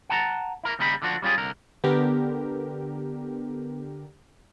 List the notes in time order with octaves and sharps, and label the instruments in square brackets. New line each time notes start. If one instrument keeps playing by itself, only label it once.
[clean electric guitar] F#5 A5 A#5
E4 A#4
D#2 C#3 G3 D#4 A#4 B5
D3 F3 D4 F#4
G3 C#4 F4 G4 G#4
C2 D3 A#4
[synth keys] D3 G4 A#4 [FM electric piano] B3